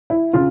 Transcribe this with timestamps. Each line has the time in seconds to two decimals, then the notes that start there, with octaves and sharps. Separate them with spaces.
0.10 E4
0.33 C#3 F4